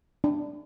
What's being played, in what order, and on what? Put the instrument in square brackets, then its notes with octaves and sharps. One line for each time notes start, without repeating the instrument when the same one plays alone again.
[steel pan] D4